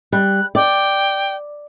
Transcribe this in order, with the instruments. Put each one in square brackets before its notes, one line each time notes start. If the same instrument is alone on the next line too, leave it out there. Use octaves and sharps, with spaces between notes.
[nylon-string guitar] G3 [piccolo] F#6
[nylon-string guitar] D5 [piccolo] G5